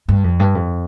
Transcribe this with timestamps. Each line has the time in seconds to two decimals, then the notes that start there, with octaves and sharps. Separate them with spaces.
0.08 G2
0.24 F2
0.40 G2
0.55 F2